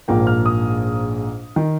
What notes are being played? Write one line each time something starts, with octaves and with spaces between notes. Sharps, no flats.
A#1 G#2 F3 A#3 G5
F6
D#6
D#3